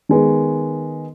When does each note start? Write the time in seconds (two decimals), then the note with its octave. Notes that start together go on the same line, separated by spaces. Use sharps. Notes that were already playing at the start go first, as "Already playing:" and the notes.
0.09 D#3 G#3 B3